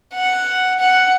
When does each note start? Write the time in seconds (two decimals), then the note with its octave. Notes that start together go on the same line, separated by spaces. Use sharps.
0.14 F#5
0.79 F#5